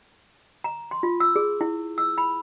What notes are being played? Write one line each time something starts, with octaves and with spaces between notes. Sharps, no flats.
A#5
C6
F4
E6
G#4
E4
E6
B5